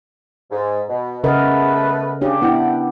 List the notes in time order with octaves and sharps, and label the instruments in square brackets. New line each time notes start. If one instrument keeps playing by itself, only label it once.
[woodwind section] G#2
B2
[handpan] C#3 A#4 D#5 [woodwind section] A3 B3 B4
[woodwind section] C#3 [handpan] D4 G4
[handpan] B3 D4 E4 [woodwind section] F#5 G5